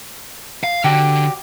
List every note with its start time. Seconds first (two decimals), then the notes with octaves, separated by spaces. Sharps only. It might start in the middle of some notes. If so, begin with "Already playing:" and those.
0.64 F5
0.84 D3 F#4 G4